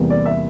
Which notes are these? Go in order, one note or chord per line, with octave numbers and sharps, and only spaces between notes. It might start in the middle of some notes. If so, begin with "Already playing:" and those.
Already playing: E2 C3 G3 A#3
D5
E5